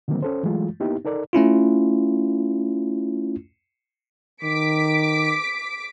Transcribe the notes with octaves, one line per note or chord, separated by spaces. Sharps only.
D3 D#3 F#3 G3 A#3 C4
C#4 A4 C5
E3 F#3 G#3 A3 F4
A#3 B3 D#4 E4 G4
D#4 A4 A#4 D5
A3 C#4 E4 F4
D#3 D6 B6 D7